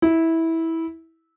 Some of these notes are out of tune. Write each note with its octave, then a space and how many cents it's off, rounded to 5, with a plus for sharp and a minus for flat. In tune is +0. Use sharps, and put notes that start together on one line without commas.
E4 -15